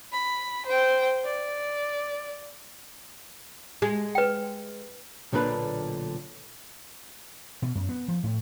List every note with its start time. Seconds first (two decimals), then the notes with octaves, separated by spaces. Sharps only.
0.12 B5
0.66 C5 G5
1.25 D5
3.82 G#3
4.15 B4 G5
5.33 B1 A#2 D3 D4 B4
7.62 B2
7.75 F#2
7.89 B3
8.08 F3
8.24 A2